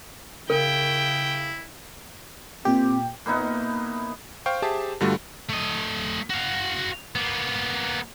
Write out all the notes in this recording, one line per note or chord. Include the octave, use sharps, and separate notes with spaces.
C#3 E4 A#4 G5
A#2 C4 G4
A#2 B3 D#4 E4
C5 F5 G5 C#6
G4 G#4 C5 E5 A5
G2 D3 G3 A3 F4 F#4
A3 D#5
F#4 F5
A#3 B3